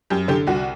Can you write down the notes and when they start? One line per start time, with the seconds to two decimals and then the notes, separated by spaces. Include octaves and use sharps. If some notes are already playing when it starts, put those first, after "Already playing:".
0.10 F#2 G4
0.28 D3 G4
0.47 C2 F#4